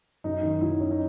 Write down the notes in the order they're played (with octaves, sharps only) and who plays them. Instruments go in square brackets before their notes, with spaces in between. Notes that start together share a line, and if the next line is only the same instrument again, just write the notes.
[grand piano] F#2 D#4
D#3
F#3 E4
C#4
D#4